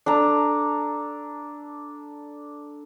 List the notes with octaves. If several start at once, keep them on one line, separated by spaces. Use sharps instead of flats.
D4 A4 A#5